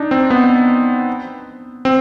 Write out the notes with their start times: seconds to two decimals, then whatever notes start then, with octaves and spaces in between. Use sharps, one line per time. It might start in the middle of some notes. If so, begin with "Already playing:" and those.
Already playing: D4 D#4
0.11 C4
0.30 B3
1.85 C4